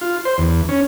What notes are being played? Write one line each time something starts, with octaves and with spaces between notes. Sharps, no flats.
F4
C5
E2
C#4